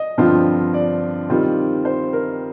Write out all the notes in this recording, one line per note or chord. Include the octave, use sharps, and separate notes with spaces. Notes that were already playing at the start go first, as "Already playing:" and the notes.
Already playing: D#5
G2 D3 F3 C4 F4
D5
D#3 G3 C4 F4
C5
A#4